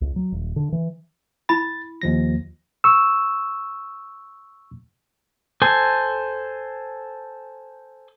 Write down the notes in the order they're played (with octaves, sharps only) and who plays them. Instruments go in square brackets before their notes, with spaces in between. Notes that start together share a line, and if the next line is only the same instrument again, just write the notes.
[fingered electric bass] C#2
F#3
D#1
D3
E3
[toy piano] E4 B5 [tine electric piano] A6
[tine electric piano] D#2 F3 A#6
[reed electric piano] C#6 E6
[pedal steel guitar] A4 C5 G#5